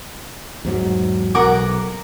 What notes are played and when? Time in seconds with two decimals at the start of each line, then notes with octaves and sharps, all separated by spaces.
0.65 E2 G#2 F#3
1.35 B1 A#4 F#5 D6